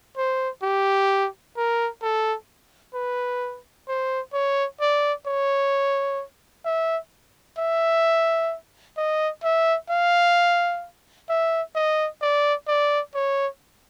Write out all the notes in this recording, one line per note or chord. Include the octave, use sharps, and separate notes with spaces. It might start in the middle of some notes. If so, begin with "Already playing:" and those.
C5
G4
A#4
A4
B4
C5
C#5
D5
C#5
E5
E5
D#5
E5
F5
E5
D#5
D5
D5
C#5